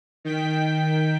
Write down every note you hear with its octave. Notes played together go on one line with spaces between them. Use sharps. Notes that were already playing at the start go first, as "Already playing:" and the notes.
D#3 G5 B6